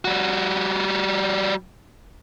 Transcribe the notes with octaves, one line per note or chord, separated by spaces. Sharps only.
G3 F#4